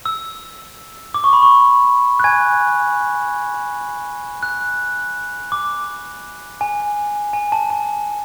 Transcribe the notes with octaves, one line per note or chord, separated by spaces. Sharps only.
E6
D6
C#6
B5
C#6
F#6
G#5 G#6
F#6
D6
G#5
G#5
A5
A5